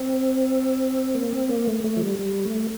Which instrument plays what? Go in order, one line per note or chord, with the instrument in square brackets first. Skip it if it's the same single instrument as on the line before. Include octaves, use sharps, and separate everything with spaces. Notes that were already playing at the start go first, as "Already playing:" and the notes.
Already playing: [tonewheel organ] C4
A#3
C4
A#3
A3
A3
F3
G3
G3
A3